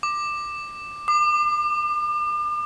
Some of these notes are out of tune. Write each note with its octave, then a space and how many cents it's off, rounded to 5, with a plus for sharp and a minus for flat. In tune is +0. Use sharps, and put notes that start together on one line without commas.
D6 +15
D6 +40